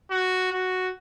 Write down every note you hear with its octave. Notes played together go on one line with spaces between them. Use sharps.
F#4
F#4